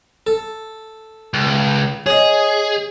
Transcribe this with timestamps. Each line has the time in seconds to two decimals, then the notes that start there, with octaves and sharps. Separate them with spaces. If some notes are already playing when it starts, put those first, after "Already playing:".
0.27 A4
1.34 C#2
2.06 G#4 C#5 D#5